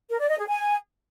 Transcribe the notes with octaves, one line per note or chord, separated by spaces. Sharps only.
A#4
D5
D#5
G#4
G#5